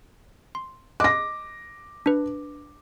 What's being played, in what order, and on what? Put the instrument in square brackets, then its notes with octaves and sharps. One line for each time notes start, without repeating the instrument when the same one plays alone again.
[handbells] C6
[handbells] D#5 F#6 [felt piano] D6 A#6
[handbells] D4 B4